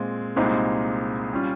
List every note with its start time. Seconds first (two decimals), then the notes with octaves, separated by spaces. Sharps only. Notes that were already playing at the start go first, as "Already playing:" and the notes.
Already playing: A#2 G#3 C4
0.36 C2 A#2 G#3 C4 D#4
1.33 G3 C#4 F4